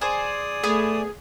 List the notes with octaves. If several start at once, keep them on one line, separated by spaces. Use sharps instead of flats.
G#4 C5 D5 G#5 D#6
A3 B3 G#4